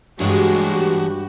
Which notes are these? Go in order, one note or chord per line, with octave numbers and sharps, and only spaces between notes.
G2 E3 G#3 F#4 G4 C#5